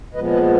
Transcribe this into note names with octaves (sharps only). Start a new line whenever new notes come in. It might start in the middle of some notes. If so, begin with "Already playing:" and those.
A#2 F3 G#3 B3 B4 D#5
B4 D#5